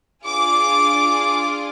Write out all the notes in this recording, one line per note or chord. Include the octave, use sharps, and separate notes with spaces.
D4 F4 G#4 D6